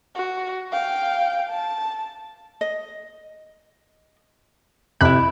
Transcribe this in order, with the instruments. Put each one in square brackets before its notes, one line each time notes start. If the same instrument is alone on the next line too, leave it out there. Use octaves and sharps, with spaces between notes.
[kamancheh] F#4
F5 G5
A5
[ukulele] D#5
[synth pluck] F2 C3 F#6 [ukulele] E4 B5